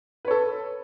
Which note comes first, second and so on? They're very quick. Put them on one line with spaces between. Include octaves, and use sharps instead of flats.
B4 C#5 A4